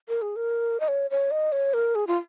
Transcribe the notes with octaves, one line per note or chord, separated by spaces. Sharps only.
A#4
G#4
A#4
D#5
C#5
C#5
D#5
C#5
A#4
G#4
F4